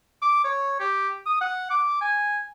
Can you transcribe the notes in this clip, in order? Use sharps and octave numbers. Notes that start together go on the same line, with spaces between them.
D6
C#5
G4
D#6
F#5
D6
G#5